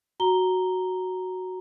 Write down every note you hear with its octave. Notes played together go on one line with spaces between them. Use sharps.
F#4 A#5 G7